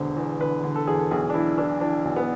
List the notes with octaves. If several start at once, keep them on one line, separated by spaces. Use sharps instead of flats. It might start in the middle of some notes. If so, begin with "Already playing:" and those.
Already playing: E1 D3 C5
E2
D3 B4
D3
A4
E2 G#4
A4
B1 G#4
D4
E3 E4
E3 D4
E3 D4
B1
B3